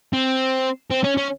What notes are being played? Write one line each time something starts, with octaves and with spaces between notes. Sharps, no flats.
C4
C4
C#4
C#4